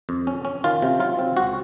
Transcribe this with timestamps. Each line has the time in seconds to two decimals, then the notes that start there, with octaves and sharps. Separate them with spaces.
0.09 F2
0.27 C#4
0.45 C#4
0.64 D#3 F4
0.82 C3
1.00 F#3 F4
1.19 C4
1.37 C#2 F#4